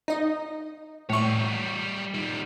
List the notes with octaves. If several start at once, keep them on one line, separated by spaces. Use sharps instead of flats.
D#4 D#5
A2 G3 C#5 C#6
D#3 G3